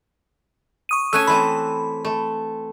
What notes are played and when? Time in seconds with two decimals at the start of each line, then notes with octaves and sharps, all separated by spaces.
0.89 C#6 D#6 D#7
1.13 A3 C#4 G#5 E6 F#6 D#7
1.27 E3 A3 C4 B5
2.05 A3